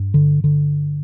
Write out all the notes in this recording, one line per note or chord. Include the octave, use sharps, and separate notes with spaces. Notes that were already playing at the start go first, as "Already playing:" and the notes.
Already playing: G2
D3
D3